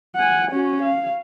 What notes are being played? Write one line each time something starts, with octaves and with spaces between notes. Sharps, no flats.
F#5 G#5
C#4 F#4
F5